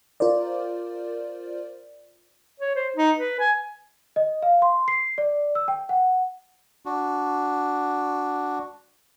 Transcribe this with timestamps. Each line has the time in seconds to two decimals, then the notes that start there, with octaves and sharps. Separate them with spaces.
0.20 F4 A#4 C5 D5
2.60 C#5
2.76 C5
2.97 D#4
3.18 B4
3.40 G#5
4.16 D#5
4.42 F5
4.62 C6
4.88 C7
5.18 D5
5.55 E6
5.68 G5
5.89 F#5
6.86 D4 F#4